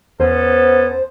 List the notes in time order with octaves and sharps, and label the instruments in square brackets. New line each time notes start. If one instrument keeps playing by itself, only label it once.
[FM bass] E2 [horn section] B3 C#4 A4 [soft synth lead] C5